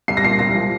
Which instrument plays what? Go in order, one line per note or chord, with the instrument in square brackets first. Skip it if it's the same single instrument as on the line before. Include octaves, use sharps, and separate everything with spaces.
[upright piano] C2 C7
A#6
A#2 C7
C2 A#6
F3